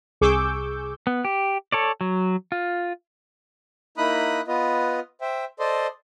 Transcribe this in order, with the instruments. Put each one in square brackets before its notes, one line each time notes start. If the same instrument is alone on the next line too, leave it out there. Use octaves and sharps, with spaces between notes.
[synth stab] C2 G#4 C#6 D6 E6 G6
[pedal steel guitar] B3
G4
A4 C#5 D5
F#3
F4
[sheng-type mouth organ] A#3 D#4 E4 B5 D#6 F#6
B3 F4 B4 D#5
C5 E5 G5
A4 C5 D5 D#5 C6